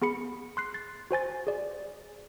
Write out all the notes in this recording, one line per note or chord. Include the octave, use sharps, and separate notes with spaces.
B3 G#4 B5 C#7
C6 F#6 C7
A6
F#4 C5 G#5 A6
G#4 D5